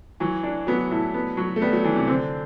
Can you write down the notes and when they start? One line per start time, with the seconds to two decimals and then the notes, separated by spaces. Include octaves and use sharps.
0.20 E3 F#3
0.43 D4
0.67 F#3 B3
0.91 A2
1.14 B3
1.37 F#3
1.56 A3
1.62 G3 B3
1.73 F#3
1.84 E3 D4
1.96 C3
2.08 D3 C4